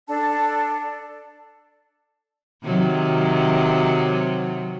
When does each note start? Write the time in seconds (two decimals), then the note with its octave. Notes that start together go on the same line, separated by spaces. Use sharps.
0.08 D4 A4 A5
2.64 C3 D#3 F#3